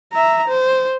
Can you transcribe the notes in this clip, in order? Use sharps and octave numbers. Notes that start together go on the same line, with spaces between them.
E5 A#5
C5